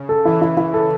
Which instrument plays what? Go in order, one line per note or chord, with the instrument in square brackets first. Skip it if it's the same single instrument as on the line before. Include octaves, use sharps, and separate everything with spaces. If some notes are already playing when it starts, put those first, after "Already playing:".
Already playing: [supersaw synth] C#3
[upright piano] A4
[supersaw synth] E3 [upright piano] E4
[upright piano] E4
E4
A4